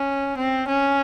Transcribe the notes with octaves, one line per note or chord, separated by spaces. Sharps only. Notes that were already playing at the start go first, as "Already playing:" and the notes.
Already playing: C#4
C4
C#4